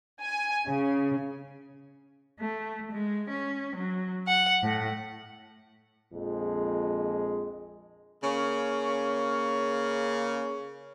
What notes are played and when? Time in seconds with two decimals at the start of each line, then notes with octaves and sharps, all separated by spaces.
0.22 G#5
0.67 C#3
2.40 A3
2.92 G#3
3.29 C#4
3.76 F#3
4.27 F#5
4.62 A2
6.13 A#1 F2 G#3
8.22 C#3 A#3 C#4